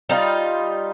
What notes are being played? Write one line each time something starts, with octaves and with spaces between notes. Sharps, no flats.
G3 D#4 F4